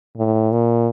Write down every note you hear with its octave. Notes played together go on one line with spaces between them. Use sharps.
A2
A#2